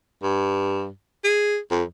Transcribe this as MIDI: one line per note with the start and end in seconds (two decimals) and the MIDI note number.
0.23 0.89 43
1.24 1.57 68
1.71 1.83 41